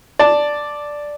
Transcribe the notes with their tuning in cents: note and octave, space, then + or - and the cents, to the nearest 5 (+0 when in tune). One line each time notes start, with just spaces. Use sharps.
D5 +0 A5 +0